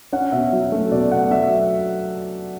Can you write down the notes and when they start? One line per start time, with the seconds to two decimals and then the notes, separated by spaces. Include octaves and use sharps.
0.13 C#4 F#5
0.32 B2 E5
0.53 F#3
0.72 A3
0.92 B2 D5
1.12 B2 F#5
1.31 F#3 E5